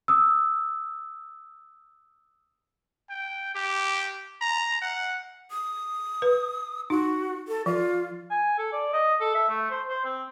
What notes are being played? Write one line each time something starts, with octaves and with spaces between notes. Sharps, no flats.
D#6 E6
G5
G4
A#5
F#5
D#6
B4
D#4 F#4
A4
F3 F4
G#5
A4
D5
D#5
A4
E5
A3
C5
C5
C4